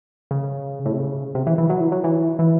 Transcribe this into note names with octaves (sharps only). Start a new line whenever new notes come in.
C#3
A2
C3
C#3
C3
E3
E3
F#3
E3
F#3
E3
E3